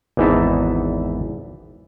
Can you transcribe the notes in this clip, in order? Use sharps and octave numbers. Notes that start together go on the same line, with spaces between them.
G#1 E2 E3 D#4 E5 A5